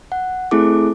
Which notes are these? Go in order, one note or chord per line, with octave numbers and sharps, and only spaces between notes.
F#5
A3 C4 E4 G#4 A4 D6